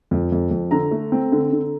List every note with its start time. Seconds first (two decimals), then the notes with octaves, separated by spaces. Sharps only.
0.11 F2
0.32 F2
0.51 F2
0.71 D3 A#5
0.91 A3
1.12 C4
1.32 D3
1.52 D3